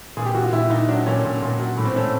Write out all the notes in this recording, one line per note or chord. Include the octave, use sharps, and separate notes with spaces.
A#2 G#4
G4
A#2 F#4
F4
A#2 E4
A#2 D#4
F#3 D4
A#2 C#4
A#2
A#2
F#3
A2
C4
A3 C#4